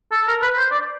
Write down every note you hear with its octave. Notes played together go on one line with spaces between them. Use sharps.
A4
A#4
B4
C5
D5